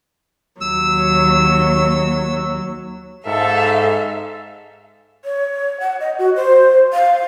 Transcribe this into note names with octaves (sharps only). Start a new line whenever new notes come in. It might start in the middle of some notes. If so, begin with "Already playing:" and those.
D#2 F#3 E6
G#2 A4 E5 F5
C#5
F#5
D#5
F#4
C5
F5